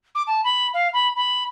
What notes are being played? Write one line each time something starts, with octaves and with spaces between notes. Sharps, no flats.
D6
A5
B5
F5
B5
B5